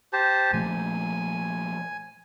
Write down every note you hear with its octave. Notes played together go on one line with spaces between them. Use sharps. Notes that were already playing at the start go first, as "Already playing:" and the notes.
G4 C5 A5
A#2 F3 A3 G#5